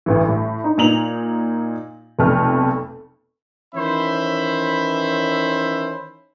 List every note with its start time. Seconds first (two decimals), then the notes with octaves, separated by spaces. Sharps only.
0.06 A1 D2 E3
0.29 A2
0.64 D#4
0.78 A#2 D#4 F7 F#7
2.19 F1 B1 F2 A3 F6
3.74 D#3 E3 C#4 C5 E5 B5